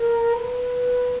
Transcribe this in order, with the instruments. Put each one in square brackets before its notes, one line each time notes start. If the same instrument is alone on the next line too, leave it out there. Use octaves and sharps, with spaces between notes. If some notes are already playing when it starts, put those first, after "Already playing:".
Already playing: [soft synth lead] A#4
B4